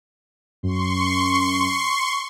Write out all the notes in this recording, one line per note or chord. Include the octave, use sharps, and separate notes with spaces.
F#2 C6 C#6